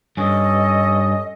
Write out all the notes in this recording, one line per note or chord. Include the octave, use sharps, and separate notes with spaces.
G2 C#4 A4 D#5